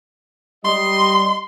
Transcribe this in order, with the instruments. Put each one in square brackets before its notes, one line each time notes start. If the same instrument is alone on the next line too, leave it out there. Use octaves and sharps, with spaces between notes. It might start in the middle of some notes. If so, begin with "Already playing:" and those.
[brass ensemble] G3 D#5 [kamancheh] C6